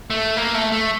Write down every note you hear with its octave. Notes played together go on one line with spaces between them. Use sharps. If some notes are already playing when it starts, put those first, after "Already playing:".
A3
A#3
A3
A3